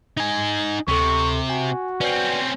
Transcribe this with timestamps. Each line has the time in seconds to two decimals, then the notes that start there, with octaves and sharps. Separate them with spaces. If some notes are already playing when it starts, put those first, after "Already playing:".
0.17 D#4 G#5
0.88 D2 C3 A4 C#6
1.50 F#4 G#5
2.01 C4 C#4 B4 D5